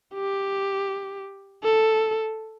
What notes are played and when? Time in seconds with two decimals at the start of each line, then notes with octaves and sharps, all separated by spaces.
0.14 G4
1.64 A4